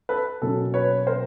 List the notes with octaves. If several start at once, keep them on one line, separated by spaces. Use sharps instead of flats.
A4 B4
B2 F#3 A#3 C#4 A4
B4 C#5
A#4 C5